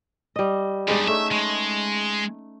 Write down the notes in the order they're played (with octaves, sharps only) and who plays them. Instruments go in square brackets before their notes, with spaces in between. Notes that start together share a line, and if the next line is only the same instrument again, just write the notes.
[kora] G3 D#5
[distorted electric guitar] E2 G3 [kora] G#3 D4 D#4
[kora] A3 C#4 [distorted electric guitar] E5
[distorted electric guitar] G#3